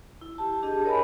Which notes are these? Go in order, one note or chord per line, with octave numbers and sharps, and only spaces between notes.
E4
G4 A5
D4 G4 G#4 D#5
A#4 C#5 D#5 G#5 A5 B5